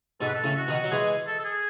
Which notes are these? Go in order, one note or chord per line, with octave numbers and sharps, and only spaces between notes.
G#2 B2 A4
B4
A4
A2 C#3
F#4
B2 D#3
F#3
E3 G#3 G#4
A4
A4
G#4